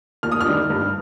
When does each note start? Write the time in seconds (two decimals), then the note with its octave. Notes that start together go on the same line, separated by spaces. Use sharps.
0.23 D#2 F6
0.32 D#6
0.41 F6
0.46 D#3 G3 D4
0.70 G2